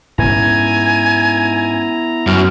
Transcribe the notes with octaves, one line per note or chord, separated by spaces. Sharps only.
G#2 B3 C#4 E4 G#5 A#5
F#2 F6